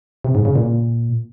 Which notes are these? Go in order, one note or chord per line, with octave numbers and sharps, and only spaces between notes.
C3
G#2
C#3
A#2